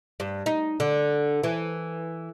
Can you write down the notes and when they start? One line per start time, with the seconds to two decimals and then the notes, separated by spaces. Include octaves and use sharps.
0.20 G2
0.46 D#4
0.80 D3
1.44 E3